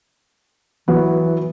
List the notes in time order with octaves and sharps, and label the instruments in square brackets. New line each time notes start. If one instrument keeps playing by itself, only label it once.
[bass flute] E3 [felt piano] F#3 B3